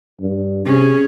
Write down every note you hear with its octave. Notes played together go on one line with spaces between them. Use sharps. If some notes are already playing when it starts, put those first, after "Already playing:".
G2
C3 C#4 G#4